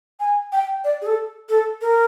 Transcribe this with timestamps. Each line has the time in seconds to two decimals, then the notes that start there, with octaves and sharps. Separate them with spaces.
0.20 G#5
0.53 G5
0.84 D5
1.02 G#4
1.06 A4
1.49 A4
1.81 A#4